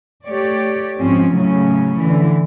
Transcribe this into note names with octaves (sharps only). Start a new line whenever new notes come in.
A3 G4 C#5 D5
G#2 F3 C4 C#4
A2 C#3 F#3 C#4
D3 E3